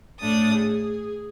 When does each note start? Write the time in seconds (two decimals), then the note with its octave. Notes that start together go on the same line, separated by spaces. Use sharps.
0.20 A2 A3 D4 D#6 A6
0.54 G#4